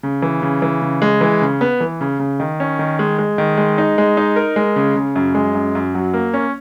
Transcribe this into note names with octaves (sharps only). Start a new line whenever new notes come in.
C#3
E3
C#3
E3
C#3
G#3
E3
C#3
B3
E3
C#3
C#3
D#3
C#4
D#3
G#3
G#3
D#3
G#3
D#4
G#3
D#4
A#4
G#3
C#3
C#3
F#2
G#3
F#2
F#2
F#3
A#3
C#4